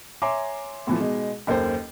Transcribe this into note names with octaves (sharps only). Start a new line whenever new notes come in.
C#5 E5 G#5 A#5 C6 D6
A2 E3 F3
B2 G#3 D#4
F#1 D#2 A#3 A4 C5